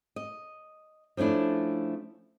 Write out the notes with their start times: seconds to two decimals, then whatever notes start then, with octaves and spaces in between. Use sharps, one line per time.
0.16 D#5
1.17 F3 A3 C#4 D4 E4